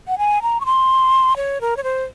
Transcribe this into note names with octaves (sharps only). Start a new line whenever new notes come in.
F#5
G#5
A#5
C#6
C6
C#5
A#4
C#5
C5